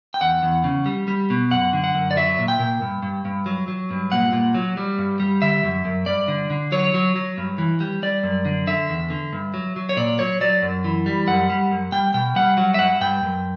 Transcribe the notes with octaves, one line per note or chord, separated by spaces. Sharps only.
G5
E2 F#5
E2
C#3
G3
G3
B2
F#2 F#5
D3
F#5
F#2
D5
F#3 E5
A#2
G5
A#2
G2
G2
G2
F#3
F#3
G2
A#2 F#5
A#2
F#3
G3
G2
G3
D3 E5
F#2
F#2
G2 D5
D3
D3
F#3 C#5
F#3
F#3
G2
E3
G3
G3 D5
F#2
D3
D3 E5
E2
D3
G2
F#3
F#3
C#5
A#2 D5
F#3 C#5
F#3 D5
F#2
E3
G3
F#2 F#5
G3
F#2
G3 G5
B2 G5
G3 F#5
F#3 F#5
E5
G2 F#5
G2 G5
F#2